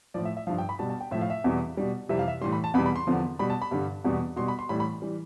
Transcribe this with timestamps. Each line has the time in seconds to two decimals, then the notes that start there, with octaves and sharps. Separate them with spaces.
0.14 A2 F3 D5
0.25 E5
0.37 E5
0.47 G2 F3 F5
0.58 G5
0.69 B5
0.79 B2 G3 A5
0.90 A5
1.01 G5
1.11 A2 F3 E5
1.21 F5
1.30 E5
1.44 E2 B2 G3
1.77 B2 G3
2.09 F2 C3 E3 G3 E5
2.19 F5
2.28 E5
2.41 A2 E3 G3 C6
2.52 B5
2.64 A5
2.74 E2 B2 G3 B5
2.86 B5
2.96 C6
3.07 E2 D3 F3
3.39 B2 G3 B5
3.50 A5
3.62 B5
3.71 G2 D3 G3
4.04 E2 B2 G3
4.36 B2 G3 C6
4.48 B5
4.59 C6
4.69 A2 E3 G3 B5
4.80 B5
5.02 E3 G3